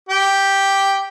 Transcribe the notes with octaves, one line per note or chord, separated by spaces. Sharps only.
G4